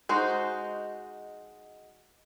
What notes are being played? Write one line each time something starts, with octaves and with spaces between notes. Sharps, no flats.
G#3 D#4 F#4 C5